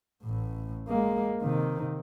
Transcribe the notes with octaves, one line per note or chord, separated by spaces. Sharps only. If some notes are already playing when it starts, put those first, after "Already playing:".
A1 A2
G#3 A#3
C3 D#3